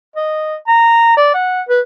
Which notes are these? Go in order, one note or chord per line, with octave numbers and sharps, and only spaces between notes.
D#5
A#5
D5
F#5
B4